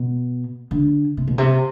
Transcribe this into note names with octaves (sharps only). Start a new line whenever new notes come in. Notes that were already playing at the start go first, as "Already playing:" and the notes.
Already playing: B2
D3
C3
B2
C3